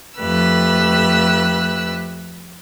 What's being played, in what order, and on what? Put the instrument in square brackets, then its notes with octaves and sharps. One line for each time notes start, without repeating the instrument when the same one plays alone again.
[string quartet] F2 A3 G4 B4 E6 F#6